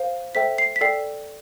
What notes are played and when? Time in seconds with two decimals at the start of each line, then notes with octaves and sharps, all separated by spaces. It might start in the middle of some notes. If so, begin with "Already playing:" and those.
Already playing: C5 F5
0.35 A4 C5 E5 G5 B6
0.58 C7
0.76 B6
0.81 A4 D5 G5 C7